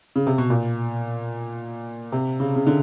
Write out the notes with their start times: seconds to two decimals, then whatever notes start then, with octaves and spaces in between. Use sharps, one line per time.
0.16 C#3
0.27 C3
0.38 B2
0.50 A#2
2.12 C3
2.40 C#3
2.56 C#3
2.67 D3